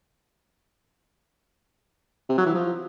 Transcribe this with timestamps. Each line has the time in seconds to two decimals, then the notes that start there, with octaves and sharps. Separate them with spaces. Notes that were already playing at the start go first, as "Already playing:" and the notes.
2.29 C3
2.38 F#3
2.46 E3
2.54 F3